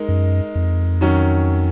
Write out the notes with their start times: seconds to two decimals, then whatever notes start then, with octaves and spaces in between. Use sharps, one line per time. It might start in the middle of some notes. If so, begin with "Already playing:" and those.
Already playing: G#3 D#4 A#4
0.08 F#2
0.55 F2
1.01 D#3 F#3 C#4